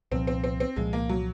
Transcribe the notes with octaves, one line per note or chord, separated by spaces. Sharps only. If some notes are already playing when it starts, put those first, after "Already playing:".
C2 A#2 F3 C4
C4
C4
C4
C2 A#2 F3 G#3
A#3
F#3